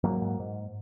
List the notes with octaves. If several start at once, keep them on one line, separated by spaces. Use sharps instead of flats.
G#2 F#3 A#3
G#2
G#2